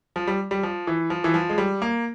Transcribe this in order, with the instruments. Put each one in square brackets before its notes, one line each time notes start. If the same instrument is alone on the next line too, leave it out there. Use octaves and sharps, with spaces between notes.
[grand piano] F3
G3
G3
F3
E3
F3
E3
F3
G#3
G3
A#3